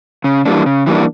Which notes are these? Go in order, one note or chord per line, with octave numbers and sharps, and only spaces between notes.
C#3
E3 G3 A#3 D4
C#3
E3 G3 A#3 D4